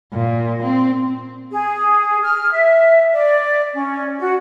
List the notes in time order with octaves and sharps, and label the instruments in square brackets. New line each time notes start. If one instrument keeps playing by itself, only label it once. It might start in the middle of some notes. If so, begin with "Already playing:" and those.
[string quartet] A#2
C4
[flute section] G#4
F6
E5
D5
C#4
F#4